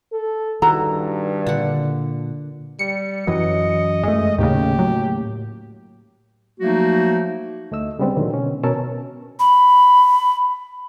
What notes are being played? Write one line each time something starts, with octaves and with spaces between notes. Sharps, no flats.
A4
G2 D#3 E4 F#4 A4 A#5
A#2 D3 F#5
G3 C#7
F#2 E3 F#3 D#5
F#2 G#3 A3
D#2 A2 C#3 A3 A#3 G4
F#3
F3 F#3 A3 A#3 D#4 F#4
D2 A3 D#5 E6
C#3 G3 G#3 B3 C4 D4
A#2 D3 D#3 F#3 G#3
B2 C#4
B2 C#4 A#4 C#5 A5 E6
B5